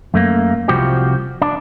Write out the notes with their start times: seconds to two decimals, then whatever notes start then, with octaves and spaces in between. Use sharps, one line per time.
0.14 F#2 A3 A#3
0.68 C2 F3 F#4 G4
1.42 D4